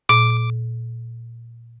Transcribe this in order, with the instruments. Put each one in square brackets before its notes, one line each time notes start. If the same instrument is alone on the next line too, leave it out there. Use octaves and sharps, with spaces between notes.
[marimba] A#2 [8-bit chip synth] D6